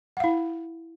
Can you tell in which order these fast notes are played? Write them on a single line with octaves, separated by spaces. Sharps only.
F#5 F5 E4